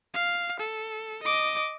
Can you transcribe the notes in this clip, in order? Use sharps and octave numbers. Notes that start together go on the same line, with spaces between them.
F5
A4
D#5 D6